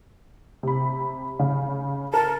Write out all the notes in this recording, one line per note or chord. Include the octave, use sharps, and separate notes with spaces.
C3 B5
C#3
A#4 A5